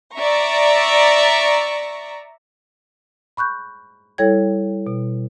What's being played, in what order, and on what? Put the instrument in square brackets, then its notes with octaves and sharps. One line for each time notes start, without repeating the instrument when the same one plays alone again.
[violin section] D5 E5 A#5 C#6
[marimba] B5 C#6 F#6 G6
G3 E4 A4 C#5 G5 G#6
B2